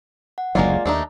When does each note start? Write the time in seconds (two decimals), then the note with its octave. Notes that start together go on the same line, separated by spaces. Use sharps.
0.38 F#5
0.55 F#1 D2 F#3 G#3 A#3 F4 D5
0.86 D#2 A3 D4 D#4